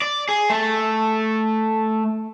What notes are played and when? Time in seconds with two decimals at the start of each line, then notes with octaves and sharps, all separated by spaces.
0.02 D5
0.29 G#4
0.49 A3